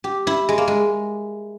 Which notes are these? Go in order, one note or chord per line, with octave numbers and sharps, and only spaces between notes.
G4
E4
G#3
A#3
G#3